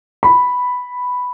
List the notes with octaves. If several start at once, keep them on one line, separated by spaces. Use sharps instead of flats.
B5